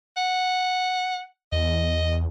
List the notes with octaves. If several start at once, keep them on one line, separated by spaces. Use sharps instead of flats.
F#5
E2 D#5